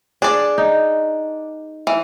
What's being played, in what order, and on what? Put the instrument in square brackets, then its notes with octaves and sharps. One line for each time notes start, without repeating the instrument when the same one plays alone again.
[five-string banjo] D4 D5 [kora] G#4
[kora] D#4
[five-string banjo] E3